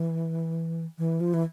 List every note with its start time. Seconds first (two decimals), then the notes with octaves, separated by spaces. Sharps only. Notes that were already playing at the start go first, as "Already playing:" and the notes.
Already playing: E3
0.98 E3
1.20 F3
1.34 E3